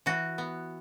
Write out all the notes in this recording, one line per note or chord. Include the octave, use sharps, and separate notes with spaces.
E3 F#4
B3